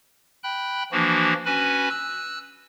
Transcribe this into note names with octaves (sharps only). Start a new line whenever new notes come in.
G5 B5 F#6
E3 F3 A#3 D4 F#4
C#4 F#4 B4 G#5 B5
E6 F#6